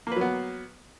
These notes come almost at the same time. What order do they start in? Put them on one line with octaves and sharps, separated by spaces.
A#3 B4 F#3 B3